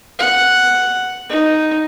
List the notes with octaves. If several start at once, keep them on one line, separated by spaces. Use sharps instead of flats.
F#5
D#4